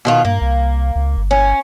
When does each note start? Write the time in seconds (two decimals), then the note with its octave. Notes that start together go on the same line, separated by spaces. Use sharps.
0.05 B2 D#3 F4
0.25 G2 A#3
0.41 C2
0.96 C#2
1.17 G1
1.31 C#4